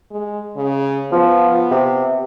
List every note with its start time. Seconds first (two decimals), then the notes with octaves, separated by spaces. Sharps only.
0.11 G#3
0.56 C#3
1.12 F3 B3
1.71 C3